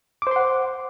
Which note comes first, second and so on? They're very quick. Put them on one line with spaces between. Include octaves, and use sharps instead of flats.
D6 C5 C6 F#5